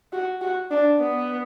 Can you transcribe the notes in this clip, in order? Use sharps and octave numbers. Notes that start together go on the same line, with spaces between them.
F#4
F#4
D4
B3